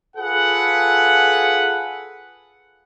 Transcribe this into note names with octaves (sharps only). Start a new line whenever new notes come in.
F4 G#4 A4 B4 F#5